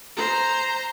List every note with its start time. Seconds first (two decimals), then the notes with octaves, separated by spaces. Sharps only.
0.16 C5 A#5